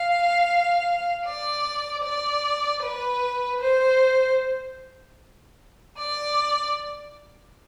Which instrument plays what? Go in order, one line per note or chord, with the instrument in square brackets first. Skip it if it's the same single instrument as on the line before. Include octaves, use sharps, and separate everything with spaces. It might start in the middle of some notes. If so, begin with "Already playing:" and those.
Already playing: [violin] F5
D5
D5
B4
C5
D5